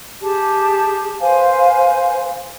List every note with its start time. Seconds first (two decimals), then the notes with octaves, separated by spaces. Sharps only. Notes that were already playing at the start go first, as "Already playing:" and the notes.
0.21 G4 G#4 A5
1.21 B4 C5 F5 G#5